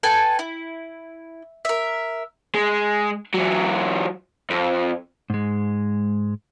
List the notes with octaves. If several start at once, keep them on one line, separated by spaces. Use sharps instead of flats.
A4 B4 G5 G#5
E4
A#4 E5
G#3
E3 F#3
F2
G#2 G#3